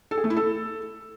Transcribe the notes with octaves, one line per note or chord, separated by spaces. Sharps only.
A4
G#4
A3
E4
A4